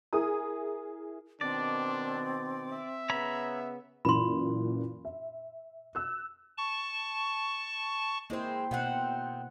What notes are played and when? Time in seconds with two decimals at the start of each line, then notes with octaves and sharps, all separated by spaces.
0.13 E4 G#4 A#4 D#6
1.41 B2 D#3 C4 D4 D5
2.72 E5
3.10 C#3 B3 C#5 A#5 B5
4.05 F#2 A#2 E3 B5 C6
5.05 E5
5.95 E6 F#6
6.58 A5 C#6
8.30 G#3 A#3 C4 E4 C5
8.71 B2 D#3 C4 F#5